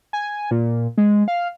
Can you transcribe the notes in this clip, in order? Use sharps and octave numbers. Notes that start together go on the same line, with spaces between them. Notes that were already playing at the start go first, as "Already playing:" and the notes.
G#5
A#2
G#3
F5